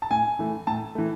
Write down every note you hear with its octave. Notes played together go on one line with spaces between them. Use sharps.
A5
A2 G#5
E3 A3
A2 A5
E3 A3